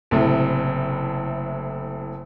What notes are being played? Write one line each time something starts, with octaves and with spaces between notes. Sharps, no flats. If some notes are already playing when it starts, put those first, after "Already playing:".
F#1 A2 C3